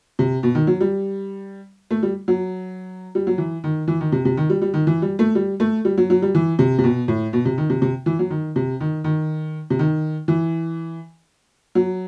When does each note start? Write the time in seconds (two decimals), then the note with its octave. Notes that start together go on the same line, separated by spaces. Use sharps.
0.19 C3
0.43 B2
0.55 D#3
0.67 F#3
0.81 G3
1.91 A3
2.03 G3
2.28 F#3
3.15 G3
3.27 F#3
3.38 E3
3.64 D#3
3.88 E3
4.01 D#3
4.12 C3
4.25 C3
4.37 D#3
4.50 G3
4.62 G3
4.74 D#3
4.87 E3
5.02 G3
5.19 A3
5.35 G3
5.60 A3
5.85 G3
5.98 F#3
6.10 F#3
6.22 G3
6.35 E3
6.59 C3
6.79 C3
6.84 B2
7.08 A2
7.33 B2
7.46 C3
7.58 D#3
7.70 C3
7.82 C3
8.06 E3
8.19 F#3
8.31 D#3
8.56 C3
8.81 D#3
9.04 D#3
9.70 C3
9.79 D#3
10.28 E3
11.75 F#3